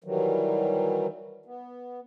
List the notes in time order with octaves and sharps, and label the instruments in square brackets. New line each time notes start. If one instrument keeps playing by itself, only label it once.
[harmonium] D#3 E3 F#3 G3
B3